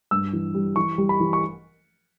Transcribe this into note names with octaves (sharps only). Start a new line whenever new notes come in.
G2 E6
E3
G3
E3 C#6
G3
B5
E3
C#6